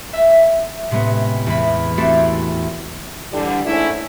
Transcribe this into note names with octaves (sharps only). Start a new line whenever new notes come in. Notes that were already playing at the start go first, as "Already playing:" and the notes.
E5
A2 C3 G#3 B3 C#4
E2 B5
A3 C4 E4 F#4 G4 A4
D3 E3 G3
G#2 A3 C#4 D4 E4